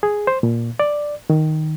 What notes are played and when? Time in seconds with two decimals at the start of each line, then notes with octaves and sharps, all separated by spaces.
0.03 G#4
0.27 C5
0.43 A#2
0.80 D5
1.30 D#3